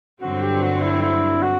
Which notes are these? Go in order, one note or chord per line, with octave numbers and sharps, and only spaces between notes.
G1 G2 D3 F#3 C4 F#4
G4
F#4
E4
E4
F#4